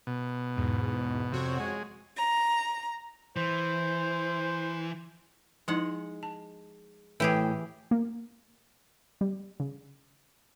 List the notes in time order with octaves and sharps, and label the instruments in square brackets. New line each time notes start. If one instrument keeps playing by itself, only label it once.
[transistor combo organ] B2
[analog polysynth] E2 G#2
[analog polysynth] F2 F#4 C#5 [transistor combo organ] C3
[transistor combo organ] G#3
[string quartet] A#5
[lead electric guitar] E3 [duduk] C5
[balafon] F3 D#4 E4 [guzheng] G#3 F#5
[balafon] A5
[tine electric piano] A2 G6 [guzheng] E3 G4 G#4
[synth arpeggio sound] A#3
G3
C#3